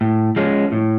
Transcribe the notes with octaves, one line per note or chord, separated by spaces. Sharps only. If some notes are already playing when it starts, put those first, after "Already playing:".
A2
F3 G#3 C#4
A2